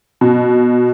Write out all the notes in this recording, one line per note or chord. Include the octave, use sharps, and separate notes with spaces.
B2